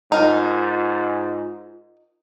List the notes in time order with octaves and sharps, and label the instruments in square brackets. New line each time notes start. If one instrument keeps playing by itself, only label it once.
[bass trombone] G#2 [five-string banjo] D#4 A#4 [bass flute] F4